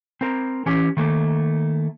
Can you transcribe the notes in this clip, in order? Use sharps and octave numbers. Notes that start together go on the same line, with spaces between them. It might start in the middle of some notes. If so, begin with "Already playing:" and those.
C4 A#4
E3 C#4 G4
D#3 A3 A#3